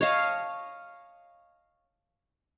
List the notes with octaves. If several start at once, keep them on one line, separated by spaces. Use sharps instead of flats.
C#5 D#5 F5 A5